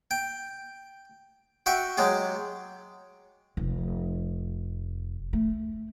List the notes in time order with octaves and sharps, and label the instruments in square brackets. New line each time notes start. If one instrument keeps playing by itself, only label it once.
[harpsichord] G5
F#4 E5 G5 C#6
F#3 G#3 G4
[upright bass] F1
A3